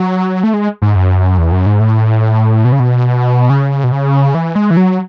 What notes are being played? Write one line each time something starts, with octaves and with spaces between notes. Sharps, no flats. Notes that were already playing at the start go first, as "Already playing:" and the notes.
Already playing: F#3
A3
G#3
G#2
F#2
E2
F#2
G#2
A2
B2
C#3
B2
C#3
B2
C#3
E3
G#3
E3
F#3